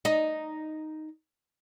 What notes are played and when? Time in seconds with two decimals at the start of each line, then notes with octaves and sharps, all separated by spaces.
0.05 D#4 D#5